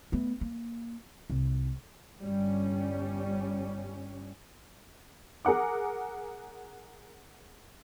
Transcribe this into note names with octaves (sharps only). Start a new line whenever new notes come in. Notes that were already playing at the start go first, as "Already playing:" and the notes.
A3 B3
A#3
C2
G1 G3 C#4
G#4 A#4 F#5 D6